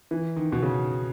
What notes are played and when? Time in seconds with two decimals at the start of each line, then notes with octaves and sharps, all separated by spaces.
0.11 E3
0.36 D#3
0.52 B2
0.62 C#3